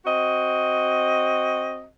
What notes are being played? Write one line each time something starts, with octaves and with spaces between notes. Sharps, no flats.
C4 F#4 D#5